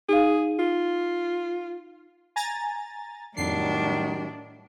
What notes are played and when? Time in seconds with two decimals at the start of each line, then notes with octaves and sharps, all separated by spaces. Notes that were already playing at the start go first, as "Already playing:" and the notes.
0.09 D#4 G#4 F5
0.59 F4
2.36 G#5 A#5 A6
3.37 F2 A2 D#3 F#3 G3 D4 C7